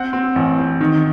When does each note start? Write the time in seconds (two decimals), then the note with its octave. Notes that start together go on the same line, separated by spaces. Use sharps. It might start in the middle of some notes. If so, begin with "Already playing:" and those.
Already playing: C4 F#5
0.13 C4
0.36 A1
0.58 C4
0.81 D#3